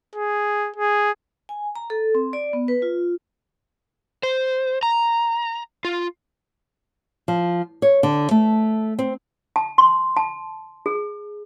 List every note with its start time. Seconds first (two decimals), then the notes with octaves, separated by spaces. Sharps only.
0.16 G#4
0.76 G#4
1.49 G#5
1.76 A#5
1.90 A4
2.15 C4
2.33 D5
2.53 B3
2.68 B4
2.82 F4
4.23 C5
4.83 A#5
5.85 F4
7.28 F3
7.82 C#5
8.03 D3
8.31 A3
8.99 C4
9.56 A5
9.78 C6
10.17 A5
10.86 G#4